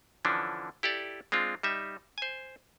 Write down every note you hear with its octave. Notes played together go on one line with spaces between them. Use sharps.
D3 E3 F3 C#4 D4
E4 G4 A4 D5
G#3 C4 D4 F4
G3 D#4 E5
C5 G#5